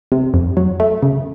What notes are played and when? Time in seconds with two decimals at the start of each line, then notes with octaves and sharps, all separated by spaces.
0.12 C3
0.34 F2
0.57 F#3
0.80 A3
1.02 C#3